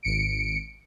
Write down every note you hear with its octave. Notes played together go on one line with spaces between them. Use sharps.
G#1 C#7 D7